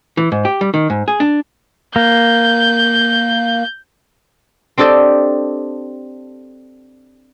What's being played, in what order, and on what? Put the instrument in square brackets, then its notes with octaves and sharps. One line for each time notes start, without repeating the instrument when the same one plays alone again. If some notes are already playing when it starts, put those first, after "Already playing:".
[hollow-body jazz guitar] E3
G#2
G4
G3
D#3
G#2
G#4
D4
[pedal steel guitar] A#3 [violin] G6
[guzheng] C4 D4 G4 A4 D5 D#5